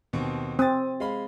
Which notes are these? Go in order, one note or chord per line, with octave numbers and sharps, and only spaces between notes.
D#2 B2 C4
C4 D#6 A6
G#3 F5 B5